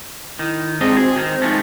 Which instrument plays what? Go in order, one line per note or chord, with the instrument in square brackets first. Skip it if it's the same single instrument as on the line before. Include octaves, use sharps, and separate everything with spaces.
[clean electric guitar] D#3 [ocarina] E4
[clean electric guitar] G#2 D4 D#5 [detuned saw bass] C4 [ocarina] G#4
[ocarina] F#4 [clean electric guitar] G#4
[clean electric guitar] D#3 [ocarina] C5
[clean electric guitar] F3 G#3 A3 [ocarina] D#4